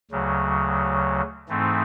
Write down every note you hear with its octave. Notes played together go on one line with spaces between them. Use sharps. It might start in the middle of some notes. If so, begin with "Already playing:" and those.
D2 C#3 F#3
G#2 E3 A3 C4 D#4